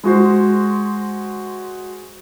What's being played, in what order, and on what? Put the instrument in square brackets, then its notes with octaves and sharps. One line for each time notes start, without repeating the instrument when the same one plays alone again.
[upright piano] G#3 F#4 C5